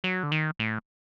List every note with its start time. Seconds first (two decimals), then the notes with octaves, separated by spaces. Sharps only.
0.04 F#3
0.23 D3
0.32 D#3
0.59 A2